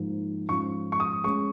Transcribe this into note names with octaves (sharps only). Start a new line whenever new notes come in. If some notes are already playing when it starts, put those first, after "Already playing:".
Already playing: G#2 F3 A#3 D#4
G#2 F3 C#4 F4 C#6
C#6
D#6
G#3 C#4 G#4 C#6